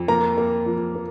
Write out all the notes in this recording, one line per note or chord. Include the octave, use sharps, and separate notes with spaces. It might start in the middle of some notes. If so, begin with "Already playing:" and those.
Already playing: F2
A#3 A#5
A#3
F2
A#3